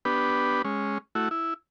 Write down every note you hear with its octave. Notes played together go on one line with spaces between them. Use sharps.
B3 D4 G4 B4
G#3 C#4
A3 E4 F#4
E4